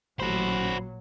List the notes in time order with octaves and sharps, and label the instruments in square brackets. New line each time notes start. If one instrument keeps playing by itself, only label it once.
[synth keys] A1 [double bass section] A#2 F#3 [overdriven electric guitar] F#4 C5 [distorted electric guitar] B5